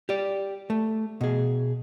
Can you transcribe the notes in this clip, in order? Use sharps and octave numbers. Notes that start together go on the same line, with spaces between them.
G4 D5
A3
B2 G#4